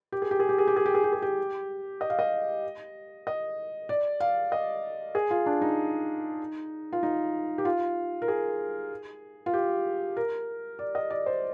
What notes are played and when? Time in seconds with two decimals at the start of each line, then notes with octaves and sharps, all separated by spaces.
0.12 G4
0.22 G#4
0.31 G4
0.40 G#4
0.49 G4
0.58 G#4
0.67 G4
0.76 G#4
0.86 G4
0.94 G#4
1.04 G4
1.13 G#4
1.22 G4
2.01 D#5
2.10 F5
2.19 D#5
3.27 D#5
3.89 D5
4.20 F5
4.52 D#5
5.15 G#4
5.31 F4
5.46 D4
5.62 D#4
6.93 F4
7.03 D#4
7.58 G4
7.65 F4
8.22 A#4
8.28 G#4
9.46 F4
9.54 G4
10.17 A#4
10.79 D5
10.95 D#5
11.10 D5
11.26 C5